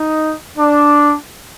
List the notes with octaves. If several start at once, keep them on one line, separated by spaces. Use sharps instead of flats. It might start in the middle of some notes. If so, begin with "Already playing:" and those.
Already playing: D#4
D4